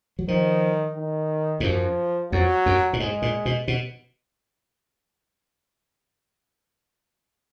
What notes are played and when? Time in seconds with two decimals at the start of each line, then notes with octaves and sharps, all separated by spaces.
0.19 F#3
0.28 D#3 F3
0.96 D#3
1.60 G#2
1.64 F#2 F3
2.32 F2 F#3
2.66 F#2
2.93 A#2
3.00 G#2 G#3
3.22 A#2
3.45 B2
3.68 B2